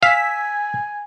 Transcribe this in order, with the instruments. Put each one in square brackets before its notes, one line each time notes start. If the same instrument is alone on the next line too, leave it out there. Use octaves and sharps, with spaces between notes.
[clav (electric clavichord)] F5 [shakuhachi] G#5 [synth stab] E6 B6